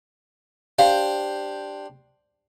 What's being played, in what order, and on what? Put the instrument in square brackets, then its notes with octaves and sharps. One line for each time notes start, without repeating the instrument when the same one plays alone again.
[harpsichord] D4 G4 C5 [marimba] F5